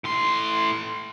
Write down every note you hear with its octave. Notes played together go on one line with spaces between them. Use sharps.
A2 C6